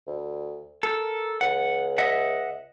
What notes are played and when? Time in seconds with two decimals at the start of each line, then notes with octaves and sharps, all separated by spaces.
0.07 D2
0.83 A4 A#4
1.41 C#2 F#5
1.98 D#5 E5 F#5